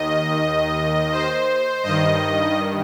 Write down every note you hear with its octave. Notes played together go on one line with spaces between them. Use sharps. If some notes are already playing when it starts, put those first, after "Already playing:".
Already playing: D#2 D#3 D#5
C5
G2 D#3 D#5